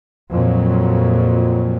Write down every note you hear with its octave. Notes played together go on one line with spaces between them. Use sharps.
F2 A#2 F#3